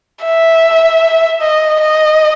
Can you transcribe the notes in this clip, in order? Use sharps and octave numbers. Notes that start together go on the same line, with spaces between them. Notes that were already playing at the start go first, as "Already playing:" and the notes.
E5
D#5
D#5